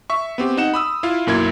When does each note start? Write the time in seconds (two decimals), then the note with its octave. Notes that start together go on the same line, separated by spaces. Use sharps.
0.10 E5 C#6
0.38 B3 C4 G4
0.57 D#4 F#5 E7
0.74 B5 D#6 E6
1.03 E4 F4 F5
1.27 B1 F#2 A#3 E4 G#6